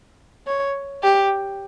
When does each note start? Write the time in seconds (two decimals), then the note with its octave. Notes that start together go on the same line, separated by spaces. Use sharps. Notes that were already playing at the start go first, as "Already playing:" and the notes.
0.47 C#5
1.03 G4